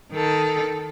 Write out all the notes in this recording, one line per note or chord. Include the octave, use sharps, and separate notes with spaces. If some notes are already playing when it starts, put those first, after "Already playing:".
D#3 A4